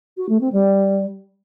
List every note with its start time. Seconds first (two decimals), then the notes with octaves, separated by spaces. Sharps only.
0.17 F#4
0.29 A3
0.40 C4
0.52 G3